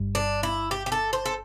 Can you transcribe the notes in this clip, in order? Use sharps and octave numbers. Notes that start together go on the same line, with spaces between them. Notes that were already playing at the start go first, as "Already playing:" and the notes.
Already playing: G1 G2 G3
D4
E4
G4
G4
A4
C5
A4